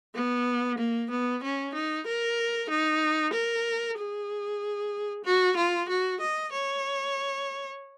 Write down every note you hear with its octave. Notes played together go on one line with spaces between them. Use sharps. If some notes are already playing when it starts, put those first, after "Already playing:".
B3
A#3
B3
C#4
D#4
A#4
D#4
A#4
G#4
F#4
F4
F#4
D#5
C#5